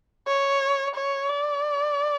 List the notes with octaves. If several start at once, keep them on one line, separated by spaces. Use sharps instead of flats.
C#5
C#5
D5